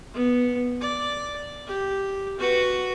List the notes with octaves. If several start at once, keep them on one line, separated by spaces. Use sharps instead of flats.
B3
D5
G4
F#4 B4